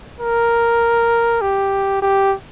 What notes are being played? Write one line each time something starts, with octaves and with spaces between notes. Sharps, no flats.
A#4
G4
G4